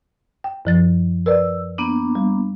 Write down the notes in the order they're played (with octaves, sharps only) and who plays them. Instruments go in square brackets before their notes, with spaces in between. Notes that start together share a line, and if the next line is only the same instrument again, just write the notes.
[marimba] G5
F#2 F3 A6
[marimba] A#4 B4 D5 [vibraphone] E6
[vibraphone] A#3 B3 D4
[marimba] G3